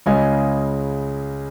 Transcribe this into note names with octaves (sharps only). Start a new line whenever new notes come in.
C#2 C#3 G#3 D#5 G#5